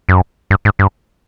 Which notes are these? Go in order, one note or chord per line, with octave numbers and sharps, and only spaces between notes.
F#2
G2
G#2
G2